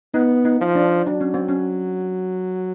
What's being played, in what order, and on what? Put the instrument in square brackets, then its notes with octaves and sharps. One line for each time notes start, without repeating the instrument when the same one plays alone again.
[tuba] B3 [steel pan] D#4
[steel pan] D#4
[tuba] F3
[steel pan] D4
[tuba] F#3 [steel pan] D4
[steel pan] C#4
C4
C#4